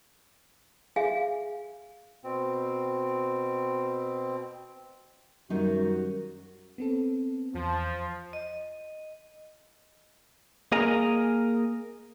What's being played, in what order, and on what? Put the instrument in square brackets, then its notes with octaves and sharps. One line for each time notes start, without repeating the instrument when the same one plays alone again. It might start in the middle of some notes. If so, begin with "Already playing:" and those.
[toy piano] G#4 E5 F5 G#5
[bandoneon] B2 C4
[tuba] F#2 [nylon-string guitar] D#3 G3 D#4 [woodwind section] F#4
[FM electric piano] B3 C4 A4
[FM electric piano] E2 [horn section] F3
[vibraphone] D#5
[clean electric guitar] A#3 G#4 A#4 D#5 G#5 A#5